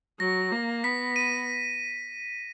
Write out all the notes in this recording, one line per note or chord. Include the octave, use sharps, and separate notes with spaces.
F#3 A#6
A#3
B3 B6
D#7